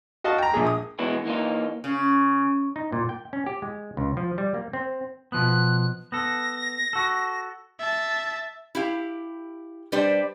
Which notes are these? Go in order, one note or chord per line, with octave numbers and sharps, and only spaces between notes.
F#4 D#5 F5 A5
G5 A#5
A#1 A#2 G#4
D#6
B2 E3 G#3 B3 E4
E3 A#3 D#4 F4
C#3
D#4
A#2
G5
C#4
G4
G#3
C#2
F3
G3
A#3
C4
B2 F3 B3 F#6
B3 A4 A#6
F#4 A4
E5 A5
E4 G4 F5
G3 D4 G4 B4 C5 D5